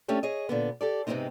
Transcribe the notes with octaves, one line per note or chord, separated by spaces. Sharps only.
A3 C#4 D4 G4 A4
G#4 C#5 D#5
A#2 D3 B3
G4 A4 D5
G#2 C3 A3 B3 C4 D#4